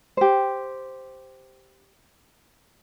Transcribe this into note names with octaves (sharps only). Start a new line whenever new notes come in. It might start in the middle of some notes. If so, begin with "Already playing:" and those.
G4 C5